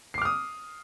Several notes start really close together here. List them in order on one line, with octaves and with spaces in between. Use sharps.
C7 D6 F6 D#6